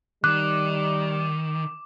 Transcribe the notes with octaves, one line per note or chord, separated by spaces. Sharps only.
D#3 G3 D6 F#6